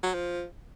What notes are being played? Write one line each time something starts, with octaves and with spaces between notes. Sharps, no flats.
F#3
F3